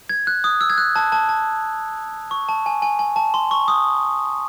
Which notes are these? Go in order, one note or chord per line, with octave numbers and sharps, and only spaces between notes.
G#6
F#6
D#6
E6
G#6
F#6
A5
A5
A5
C#6
A5
G#5
G#5
G#5
A5
C6
C#6
D#6